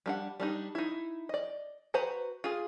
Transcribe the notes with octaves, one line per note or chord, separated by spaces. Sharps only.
G3 D4 F#5
G3 D4 D#4
D#4 E4
D5 D#5
F#4 B4 C5 A#5
F4 G#4